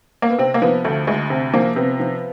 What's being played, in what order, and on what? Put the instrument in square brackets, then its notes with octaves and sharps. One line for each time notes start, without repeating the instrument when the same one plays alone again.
[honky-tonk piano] A#3
B3
C3 C4
A#3
F3 B3
D2 A3
D2 G#3
C3
F3 A#3
C3 B3
F3